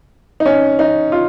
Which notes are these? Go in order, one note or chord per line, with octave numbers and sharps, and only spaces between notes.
D#4
C#4
D#4
F4